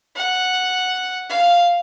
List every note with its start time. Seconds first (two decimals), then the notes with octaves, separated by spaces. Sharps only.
0.16 F#5
1.30 F5